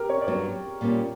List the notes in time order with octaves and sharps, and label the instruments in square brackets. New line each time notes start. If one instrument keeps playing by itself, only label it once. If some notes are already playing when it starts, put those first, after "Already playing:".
Already playing: [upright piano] G4 A#4
C#5
D5
[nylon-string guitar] G2 F#3 B3 [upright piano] C#5
[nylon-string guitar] A#2 G3 A#3 C#4